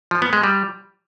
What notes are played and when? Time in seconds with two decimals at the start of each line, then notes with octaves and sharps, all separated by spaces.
0.11 F3
0.22 B3
0.33 G#3
0.43 G3